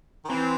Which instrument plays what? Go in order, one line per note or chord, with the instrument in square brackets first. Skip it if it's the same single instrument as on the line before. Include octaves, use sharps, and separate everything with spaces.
[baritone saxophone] D#3
[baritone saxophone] E3 [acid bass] C4